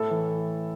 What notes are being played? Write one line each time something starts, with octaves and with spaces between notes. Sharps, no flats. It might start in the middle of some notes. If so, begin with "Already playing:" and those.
Already playing: A2 A4
E3